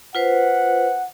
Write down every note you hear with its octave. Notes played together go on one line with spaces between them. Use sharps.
F4 B4 C5 F#5